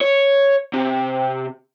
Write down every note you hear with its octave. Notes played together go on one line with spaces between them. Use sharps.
C#5
C3